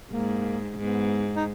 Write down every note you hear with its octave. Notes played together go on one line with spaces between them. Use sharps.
G#2 A#3
G#2 B3
D#4